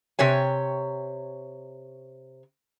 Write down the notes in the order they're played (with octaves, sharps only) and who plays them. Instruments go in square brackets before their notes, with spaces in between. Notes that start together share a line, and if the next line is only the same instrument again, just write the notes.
[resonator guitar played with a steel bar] C3 G4 C#5 G#5